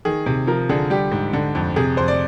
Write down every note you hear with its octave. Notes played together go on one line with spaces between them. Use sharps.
D#3 G#4
C3
F3 A#4
D3 G#4
G3 G4
G#2
D3
F2
C3 G#4
F2 C5
D5